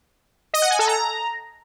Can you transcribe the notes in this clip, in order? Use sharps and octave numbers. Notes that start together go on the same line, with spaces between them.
D#5
F#5
G#5
A4
A#5